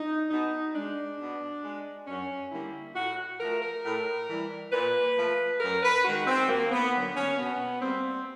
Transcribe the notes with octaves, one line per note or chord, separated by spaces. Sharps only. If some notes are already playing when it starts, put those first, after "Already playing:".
Already playing: D#4
B2 D#4
G#3 D4
B2
G#3
F#2 C#4
D3 G3 A#3 E4
A2 F#4
F3 A3 A#4
A#4
A2
E3 G3
A#2 B4
F3 A3
F#2 A#4
B4
D#3 G#3 F#4
C4
D#2 A#3
B3
D3 F#3 A#3
C#4
B2 B3
G3 A#3 C4